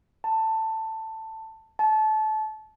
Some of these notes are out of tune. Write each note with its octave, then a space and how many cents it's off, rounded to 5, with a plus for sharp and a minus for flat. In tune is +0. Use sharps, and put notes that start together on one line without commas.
A5 +15
A5 -25